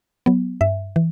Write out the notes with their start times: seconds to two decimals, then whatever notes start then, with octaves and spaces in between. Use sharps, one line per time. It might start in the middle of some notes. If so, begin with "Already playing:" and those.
0.26 F#3 B3
0.61 G2 E5
0.96 E3